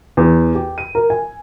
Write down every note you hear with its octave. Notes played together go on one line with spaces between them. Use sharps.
E2
G4
D#7
A#4
G#5